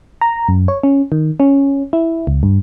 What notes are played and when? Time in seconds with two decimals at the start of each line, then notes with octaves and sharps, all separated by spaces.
0.21 A#5
0.48 F#2
0.68 C#5
0.83 C#4
1.12 D#3
1.40 C#4
1.93 E4
2.27 C#2
2.43 G2